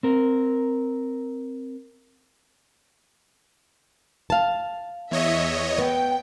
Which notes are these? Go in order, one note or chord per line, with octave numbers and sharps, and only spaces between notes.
C4 A#4
F5 A5
E2 C#5 D#5 E5
B3 G5